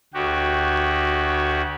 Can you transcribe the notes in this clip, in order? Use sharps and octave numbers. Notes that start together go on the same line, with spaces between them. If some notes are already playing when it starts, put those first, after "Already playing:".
D2 F#4 G4